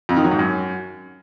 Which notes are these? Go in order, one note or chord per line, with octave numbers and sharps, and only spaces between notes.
F2
D#3
F#3
G#2
F#2